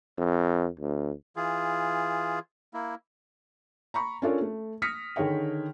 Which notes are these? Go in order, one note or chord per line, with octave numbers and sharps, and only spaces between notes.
F2
D2
E3 F4 G#4
A#3 E4
A#5 B5 C#6
C#4 D4 F4 A4 A#4 C#5
A3
D#6 F6 A#6 B6 C#7
D3 D#3 G#4 C#5 G5